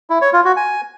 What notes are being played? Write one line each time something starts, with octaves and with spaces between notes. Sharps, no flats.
E4
C#5
F4
F#4
G#5